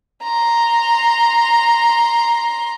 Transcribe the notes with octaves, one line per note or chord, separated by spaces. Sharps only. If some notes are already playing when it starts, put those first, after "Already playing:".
A#5 C6